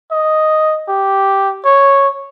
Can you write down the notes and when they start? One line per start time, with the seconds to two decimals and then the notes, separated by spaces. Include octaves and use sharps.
0.12 D#5
0.88 G4
1.65 C#5